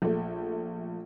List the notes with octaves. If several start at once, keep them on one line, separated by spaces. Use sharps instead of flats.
A#1 A3